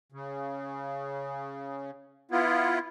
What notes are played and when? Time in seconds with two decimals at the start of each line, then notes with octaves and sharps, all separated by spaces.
0.12 C#3
2.31 B3 E4 F4